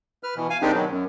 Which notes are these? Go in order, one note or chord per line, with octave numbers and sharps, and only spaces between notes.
B4 F6
B2 E3
F5 G#5
D#3 G#3 C4 D4 D#4 G4
B2 D#3 F#3
F#2